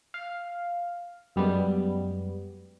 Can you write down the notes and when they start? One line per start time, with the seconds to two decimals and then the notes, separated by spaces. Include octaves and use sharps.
0.14 F5
1.36 F#2 G3 G#3 B3